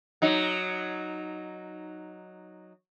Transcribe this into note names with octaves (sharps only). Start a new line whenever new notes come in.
F#3 D#4